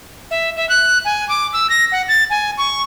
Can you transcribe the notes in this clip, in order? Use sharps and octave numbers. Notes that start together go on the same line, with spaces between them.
E5
E5
F#6
G#5
D6
E6
A#6
F#5
A6
G#5
C#6